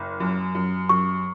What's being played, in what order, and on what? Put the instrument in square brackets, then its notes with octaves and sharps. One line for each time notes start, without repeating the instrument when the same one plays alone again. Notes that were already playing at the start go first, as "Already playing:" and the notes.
Already playing: [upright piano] F#1
F#2
F#2
[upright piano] F#2 [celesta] C#6